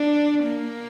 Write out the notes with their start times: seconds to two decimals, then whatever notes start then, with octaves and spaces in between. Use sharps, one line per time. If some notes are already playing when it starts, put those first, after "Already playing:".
Already playing: D4
0.43 A#3